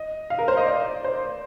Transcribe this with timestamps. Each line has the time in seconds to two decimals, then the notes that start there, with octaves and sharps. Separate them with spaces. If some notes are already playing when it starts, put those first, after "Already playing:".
Already playing: D#5
0.30 F5
0.39 A#4
0.48 C5
0.57 D#5
0.66 D5
1.04 C5